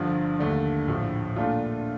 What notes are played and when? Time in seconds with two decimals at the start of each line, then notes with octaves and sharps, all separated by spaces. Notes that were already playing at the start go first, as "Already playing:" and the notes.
Already playing: G1 G2 D3 F3
0.39 D#2 D3 A3 D4
0.88 A#1 A2 F3
1.36 A#2 A3 D4 F4